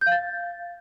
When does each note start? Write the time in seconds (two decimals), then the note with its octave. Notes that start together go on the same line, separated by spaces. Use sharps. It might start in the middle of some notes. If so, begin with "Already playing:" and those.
0.01 G6
0.06 F5
0.12 A6